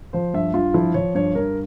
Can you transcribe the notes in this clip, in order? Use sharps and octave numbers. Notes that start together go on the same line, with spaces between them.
F3 C5
G2 E5
G2 F4
F3 E4
F3 C#5
G2 C#5
G2 A#4